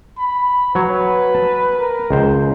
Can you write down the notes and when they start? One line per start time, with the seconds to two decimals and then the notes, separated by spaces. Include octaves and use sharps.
0.18 B5
0.75 F#3 B4 C#5
1.35 A5
1.79 A#4
2.11 C#2 C5